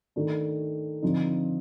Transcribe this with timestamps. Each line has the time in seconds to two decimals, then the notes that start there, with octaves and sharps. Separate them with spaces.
0.16 D#3 A3 D4
1.02 D3 F3 C4 D#4